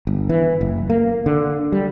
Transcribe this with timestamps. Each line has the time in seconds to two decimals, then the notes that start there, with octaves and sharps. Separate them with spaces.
0.07 G1
0.29 E3
0.61 F#1
0.90 A#3
1.26 D3
1.72 G3